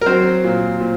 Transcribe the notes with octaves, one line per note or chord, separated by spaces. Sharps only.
A#4
F#3 C4 C5
A#2
A#2